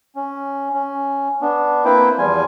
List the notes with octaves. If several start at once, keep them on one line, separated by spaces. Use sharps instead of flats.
C#4
C#4
B3 D4
A#3 C4 E4 B4 C5 G5
E2 F3 G3 F4 G#5